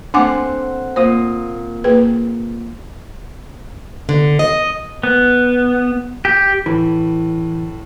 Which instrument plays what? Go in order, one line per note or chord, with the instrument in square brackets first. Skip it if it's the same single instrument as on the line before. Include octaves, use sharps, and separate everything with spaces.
[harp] A3 C4 F#5 [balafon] D4 G#5 D6
[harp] A#2 D#6 [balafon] C5
[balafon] A#3 G#4 B4
[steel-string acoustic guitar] D3
D#5
[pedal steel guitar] B3
G4
[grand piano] A2 [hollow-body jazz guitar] E3